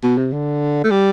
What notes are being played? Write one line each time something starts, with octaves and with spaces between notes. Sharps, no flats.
B2
C3
D3
A3
G3